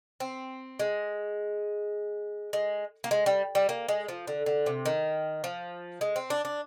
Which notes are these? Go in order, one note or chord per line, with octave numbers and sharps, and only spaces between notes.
C4
G#3
G#3
A#3
G#3
G3
G3
A#3
G#3
F3
D3
D3
C3
D#3
F3
G#3
C4
D4
D4